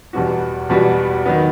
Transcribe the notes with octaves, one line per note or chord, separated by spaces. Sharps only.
E2 B2 G3 B3 F#4
E2 B2 G3 B3 F#4
D#3 F#3 B3